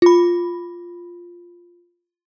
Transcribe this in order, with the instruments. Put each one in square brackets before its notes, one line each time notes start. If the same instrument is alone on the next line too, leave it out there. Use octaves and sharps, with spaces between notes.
[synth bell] F4 B5